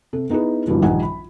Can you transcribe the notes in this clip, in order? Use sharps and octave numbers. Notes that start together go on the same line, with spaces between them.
C3 A4
B3 D#4 E4 G#4 B4
A1 E2 G2 D3 F3 F#3
A#1 D#3 G3 D#4 F#5 G#5
B5